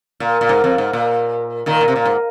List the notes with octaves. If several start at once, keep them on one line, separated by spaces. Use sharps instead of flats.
A#2
A#2
G#2
F2
G#2
A#2
A#2 D#3
A#2
C3
A#2
G#2